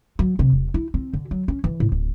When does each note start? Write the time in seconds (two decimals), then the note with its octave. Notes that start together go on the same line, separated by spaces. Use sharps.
0.19 F#3
0.39 C3
0.53 E1
0.74 E4
0.94 C4
1.13 D3
1.31 F#3
1.48 C#4
1.64 E3
1.80 A2
1.92 D1